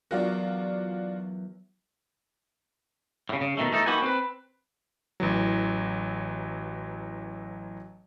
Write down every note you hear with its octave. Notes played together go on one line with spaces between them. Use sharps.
E2 F#3 D4 F4 F#4 A#4
A2 C#3
C#3
B2 D#3 A3
E2 A3 D#4 A4
A#3 D#4 F#4 G4 B4 G#5
C4 B4
A1 E3 F#3